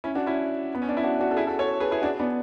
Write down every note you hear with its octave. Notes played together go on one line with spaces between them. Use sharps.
C#4 E4
D4 F#4
C#4 E4
B3
C#4
D4
E4
D4 F#4
D4 F#4
A4
E4 G#4
F#4 A4
A4 C#5
G#4 B4
E4 G#4
D4 F#4
B3 D4